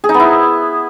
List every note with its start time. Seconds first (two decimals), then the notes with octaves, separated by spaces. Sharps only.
0.04 G#4
0.09 D#4
0.14 B3
0.20 E4